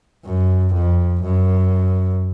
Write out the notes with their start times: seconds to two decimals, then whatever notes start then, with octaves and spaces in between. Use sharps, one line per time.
0.25 F#2
0.74 F2
1.23 F#2